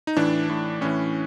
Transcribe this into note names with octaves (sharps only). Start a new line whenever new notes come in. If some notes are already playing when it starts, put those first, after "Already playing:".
D#4
A2 E3 D4
A2 E3
A2 E3 C#4